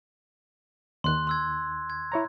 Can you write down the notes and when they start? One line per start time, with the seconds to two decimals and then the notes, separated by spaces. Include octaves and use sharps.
1.04 D#2 D#3 C6 F#6
1.27 C6 E6 G#6
1.90 G#6
2.12 E4 C#5 A#5